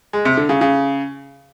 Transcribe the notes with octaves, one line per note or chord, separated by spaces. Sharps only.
G#3
C3
D3
C#3
C#3